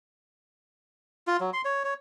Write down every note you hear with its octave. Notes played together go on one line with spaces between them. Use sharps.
F4
F#3
C6
C#5
C#5